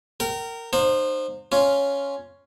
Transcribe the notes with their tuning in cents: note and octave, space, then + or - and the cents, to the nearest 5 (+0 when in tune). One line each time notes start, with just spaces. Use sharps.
A#4 -15 G5 -35
D#4 -35 C5 +10 F5 +40
C#4 +5 F4 +0